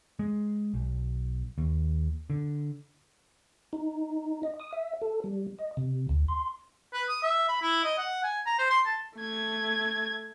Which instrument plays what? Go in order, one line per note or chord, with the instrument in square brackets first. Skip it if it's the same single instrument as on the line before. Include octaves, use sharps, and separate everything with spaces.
[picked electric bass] G#3
B1
D#2
D3
[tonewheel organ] D#4
D#5
D#6
E5
A4
G3
D#5
C3
D2
C6
[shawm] B4
D#6
E5
B5
E4
D#5
F#5
G#5
A#5
C5
C6
A5
[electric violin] A3 G#6